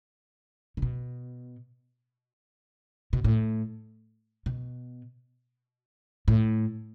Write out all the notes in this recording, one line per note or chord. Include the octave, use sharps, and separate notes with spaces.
D3
B2
B2
A2
B2
A2